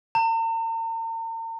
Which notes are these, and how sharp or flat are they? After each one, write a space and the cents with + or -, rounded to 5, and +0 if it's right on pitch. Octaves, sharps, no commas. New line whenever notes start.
A#5 -45